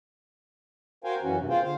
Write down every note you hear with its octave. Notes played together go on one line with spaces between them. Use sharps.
F#4 A#4 C5 F5 G5 G#5
F#2 E3 C#4 F#4
G2 C3
A#3 F4 G#4 C5 F5 G5
D3 C5 F5